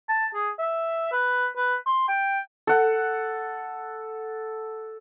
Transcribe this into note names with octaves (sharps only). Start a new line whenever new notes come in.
A5
G#4
E5
B4
B4
C6
G5
A4 F#5